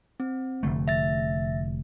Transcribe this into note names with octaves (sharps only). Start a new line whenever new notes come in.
C4
F1 D3 A3
E5 A6